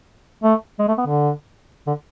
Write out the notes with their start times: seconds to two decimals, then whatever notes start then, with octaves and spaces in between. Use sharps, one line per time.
0.43 A3
0.79 G#3
0.88 A3
0.98 B3
1.06 D3
1.87 D3